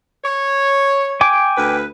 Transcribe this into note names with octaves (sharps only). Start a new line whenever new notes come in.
C#5
G5 G#5 D6
D2 B4